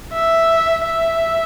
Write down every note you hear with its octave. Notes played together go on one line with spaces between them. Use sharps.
E5
E5